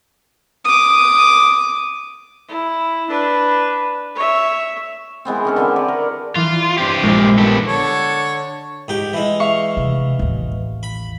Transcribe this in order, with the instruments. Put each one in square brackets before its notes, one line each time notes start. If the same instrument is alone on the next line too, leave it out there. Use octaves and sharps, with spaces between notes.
[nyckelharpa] D6 D#6
E4
D4 B4
C#5 E5
[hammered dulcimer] E3 G#3 B3 C4
D#3 C#4 A4
D3 C4 E4
G#4 B4 D5 F#5
A#4
[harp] E3 [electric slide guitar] F4
[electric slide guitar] G2 C4 G4
[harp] A#1 A#4 A6 [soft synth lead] G#3
[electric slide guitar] B3 G4 A4
[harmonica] D3 A4 C#5
[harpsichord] G#2 G4
E3 G#3
[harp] E5 F5 C#6
[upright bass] C3
A1 D#2
[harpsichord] B5